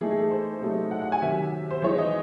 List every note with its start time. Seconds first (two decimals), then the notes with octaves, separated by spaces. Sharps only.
0.01 E3 A3 D#4 G#4
0.11 G#4
0.21 A4
0.31 C5
0.61 C3 F#3 A3 D#4
0.91 F#5
1.02 F#5
1.12 G#5
1.22 C3 D#3 F#3 E5
1.71 C5
1.82 E3 G#3 D#4 C#5
1.98 D#5